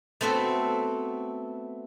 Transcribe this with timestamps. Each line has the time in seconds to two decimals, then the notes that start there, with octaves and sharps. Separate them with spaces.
0.21 A3 B3 C4 F#4 A4